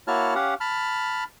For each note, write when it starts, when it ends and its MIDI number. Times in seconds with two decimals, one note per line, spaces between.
0.07 0.34 58
0.07 0.34 64
0.07 0.34 66
0.07 0.34 73
0.07 0.34 81
0.07 0.34 89
0.35 0.54 61
0.35 0.54 67
0.35 0.54 77
0.35 0.54 78
0.61 1.24 81
0.61 1.24 83
0.61 1.24 89